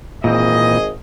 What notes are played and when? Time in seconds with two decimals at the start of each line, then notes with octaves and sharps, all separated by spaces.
0.24 G#1 A#2 E3 C4 G#4 D#5